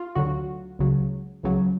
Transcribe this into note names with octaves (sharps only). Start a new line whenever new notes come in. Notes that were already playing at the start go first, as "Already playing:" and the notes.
Already playing: F4
D2 D3 F#3 F#4
C#2 C#3 F#3
C#2 C#3 F#3